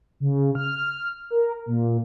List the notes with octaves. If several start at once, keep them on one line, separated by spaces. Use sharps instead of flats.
C#3
F6
A#4
A#2